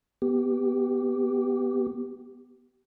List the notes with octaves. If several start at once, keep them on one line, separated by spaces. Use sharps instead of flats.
B3 G4